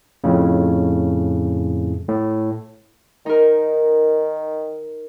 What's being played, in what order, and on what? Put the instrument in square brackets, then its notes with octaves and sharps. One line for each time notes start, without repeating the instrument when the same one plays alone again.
[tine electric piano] F2 A2 C#3
A2
[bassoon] D#3 [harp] D#4 A#4